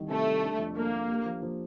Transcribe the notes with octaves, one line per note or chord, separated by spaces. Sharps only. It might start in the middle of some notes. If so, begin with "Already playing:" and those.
Already playing: C2 D#3 G3
C3 A3
G3
D4
F2
A#3 D4
D4
G4
F3
F3